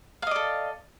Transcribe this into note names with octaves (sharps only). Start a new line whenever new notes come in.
A4 D5 D#5 F5